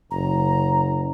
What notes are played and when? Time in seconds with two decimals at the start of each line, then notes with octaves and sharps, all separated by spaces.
0.11 F#1 A#5